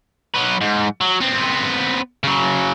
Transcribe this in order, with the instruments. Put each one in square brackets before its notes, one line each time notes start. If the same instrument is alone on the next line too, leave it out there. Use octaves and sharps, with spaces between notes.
[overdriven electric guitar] F#3 B4
G#2
F#3
B3 C4
C#3 F#3